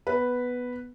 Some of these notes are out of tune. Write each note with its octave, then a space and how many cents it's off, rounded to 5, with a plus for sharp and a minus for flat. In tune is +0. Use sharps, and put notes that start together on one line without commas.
B3 +0 B4 +0